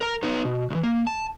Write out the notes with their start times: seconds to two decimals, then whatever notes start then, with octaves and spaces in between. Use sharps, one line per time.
0.01 A#4 A#5
0.23 B3 D#4
0.45 B2
0.70 C2 E3
0.83 A#3
1.07 A5